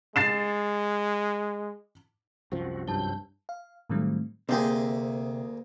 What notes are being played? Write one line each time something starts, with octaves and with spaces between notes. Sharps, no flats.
G#3 A6 C7 E7
C2 F#2 F3 C4 F#4
G2 F#3 C4 E4 A5 G6
F5
A2 D#3 F#3 G3 A3 C4
D2 C3 A#3 C4 G4 G#4